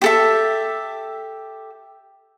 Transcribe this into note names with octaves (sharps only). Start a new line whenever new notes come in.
G4 A4 E5